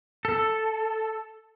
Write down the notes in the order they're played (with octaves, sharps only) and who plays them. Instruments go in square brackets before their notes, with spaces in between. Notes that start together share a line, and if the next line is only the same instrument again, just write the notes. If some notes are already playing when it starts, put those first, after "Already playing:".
[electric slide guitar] A4